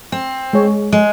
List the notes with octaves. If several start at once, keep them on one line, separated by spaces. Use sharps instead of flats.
C4
G#3 G#4 C#5
G#3